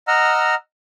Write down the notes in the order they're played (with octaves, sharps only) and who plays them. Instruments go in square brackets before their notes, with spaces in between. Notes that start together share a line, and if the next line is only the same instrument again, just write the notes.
[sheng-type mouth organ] D#5 F#5 A#5 E6 F6